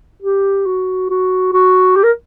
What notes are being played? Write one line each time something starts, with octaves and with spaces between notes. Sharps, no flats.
G4
F#4
F#4
F#4
G4
A#4